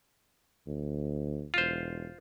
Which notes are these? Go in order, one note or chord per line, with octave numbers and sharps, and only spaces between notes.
D2
E1 F4 C5